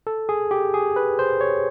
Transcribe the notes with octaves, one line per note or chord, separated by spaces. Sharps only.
A4
G#4
G4
G#4
B4
C5
C#5